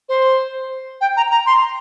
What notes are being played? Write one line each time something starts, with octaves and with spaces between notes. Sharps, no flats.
C5
G5
A#5
A#5
C6